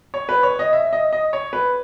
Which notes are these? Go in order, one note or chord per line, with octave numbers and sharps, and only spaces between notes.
C#5
B4
C#5
D#5
E5
D#5
D#5
C#5
B4